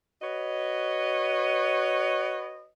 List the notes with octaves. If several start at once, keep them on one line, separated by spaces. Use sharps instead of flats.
F#4 B4 C#5 D#5